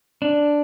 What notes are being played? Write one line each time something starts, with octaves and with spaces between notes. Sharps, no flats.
D4